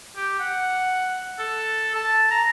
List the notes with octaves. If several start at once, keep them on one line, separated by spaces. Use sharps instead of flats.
G4
F#5
A4
A5
A#5